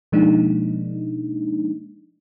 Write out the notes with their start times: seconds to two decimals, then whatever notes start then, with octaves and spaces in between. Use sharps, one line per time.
0.12 B2 F3 G#3 A#3 D4 D#4